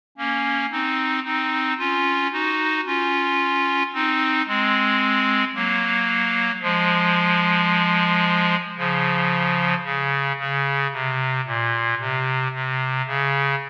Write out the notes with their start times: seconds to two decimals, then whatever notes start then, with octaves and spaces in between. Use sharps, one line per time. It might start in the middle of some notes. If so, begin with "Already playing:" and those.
0.18 A#3 C#4
0.71 C4 D#4
1.25 C4 D#4
1.78 C#4 F4
2.32 D#4 F#4
2.86 C#4 F4
3.93 C4 D#4
4.47 G#3 C4
5.55 F#3 A#3
6.62 F3 G#3
8.78 C#3 F3
9.84 C#3
10.39 C#3
10.92 C3
11.46 A#2
11.99 C3
12.53 C3
13.07 C#3